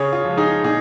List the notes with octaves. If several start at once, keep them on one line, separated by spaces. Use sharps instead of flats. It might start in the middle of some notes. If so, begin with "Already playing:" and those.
Already playing: C#3 G#4 C#5
F4
F3 G#3
D#4 G#4
A#2 D#4 G#4